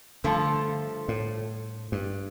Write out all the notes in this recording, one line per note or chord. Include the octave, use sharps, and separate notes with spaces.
G2 D3 F3 A3 F4 A4
A2
G2